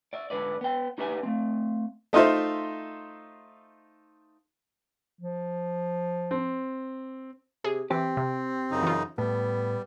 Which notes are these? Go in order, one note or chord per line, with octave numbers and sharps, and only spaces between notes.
D5 E5
G#2 D3 B4 D5
B3 G5
D#4 G4 B4 E5 F#5 G#5
A3 C4
A3 D#4 F4 C5 E5
F3
C4
C3 G#4
E3 C4 G4
C3
F#2 C#3 D#4
E3 F4
A2 G3 B3